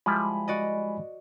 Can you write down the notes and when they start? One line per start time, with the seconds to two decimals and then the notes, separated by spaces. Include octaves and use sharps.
0.06 F3 G3 G#3 E4 G#5 B5
0.48 F#4 D5 D#5